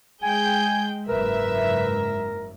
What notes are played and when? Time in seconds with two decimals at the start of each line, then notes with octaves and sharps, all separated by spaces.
0.23 G#3 G#4 G5 G#5 G6
1.09 F#1 G#2 A#4 B4 E5